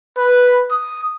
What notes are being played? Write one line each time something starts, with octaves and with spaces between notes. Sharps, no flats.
B4
D#6